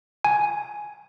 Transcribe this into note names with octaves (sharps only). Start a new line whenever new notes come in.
G#5